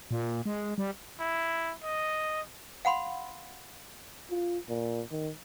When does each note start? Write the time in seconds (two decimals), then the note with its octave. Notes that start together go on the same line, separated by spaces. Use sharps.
0.11 A#2
0.46 G#3
0.78 G3
1.20 E4
1.83 D#5
2.85 F5 F#5 B5 C6
4.30 F4
4.69 A#2
5.11 D#3